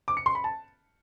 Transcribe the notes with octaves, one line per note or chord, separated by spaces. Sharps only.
D6
C#7
C6
B5
A5